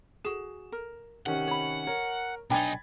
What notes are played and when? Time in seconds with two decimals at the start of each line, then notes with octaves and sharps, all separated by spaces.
0.25 F#4 G#4 E7
0.72 A#4
1.26 C3 D#3 C#4 F#5
1.47 C#5 B5
1.87 A#4 C#5
2.50 B1 D4 D#4 G5 G#5 B5 G#6 A6